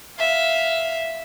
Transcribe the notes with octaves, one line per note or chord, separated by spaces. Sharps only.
E5 F5